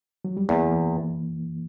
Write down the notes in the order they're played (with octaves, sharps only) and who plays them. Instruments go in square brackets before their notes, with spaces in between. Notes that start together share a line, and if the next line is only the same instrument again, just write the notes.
[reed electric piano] F#3
G3
[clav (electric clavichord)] E2 [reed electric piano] A#3
[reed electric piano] E3